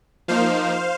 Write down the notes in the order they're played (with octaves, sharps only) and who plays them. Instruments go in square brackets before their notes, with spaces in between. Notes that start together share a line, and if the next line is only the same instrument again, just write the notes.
[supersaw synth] F3 A#3 D#4 C5 F5